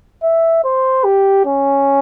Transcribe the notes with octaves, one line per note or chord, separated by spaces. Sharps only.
E5
C5
G4
C#4